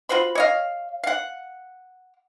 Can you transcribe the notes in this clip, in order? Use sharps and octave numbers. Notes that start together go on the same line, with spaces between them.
F4 F#4 C5 B5
C#5 D#5 F5
F5 F#5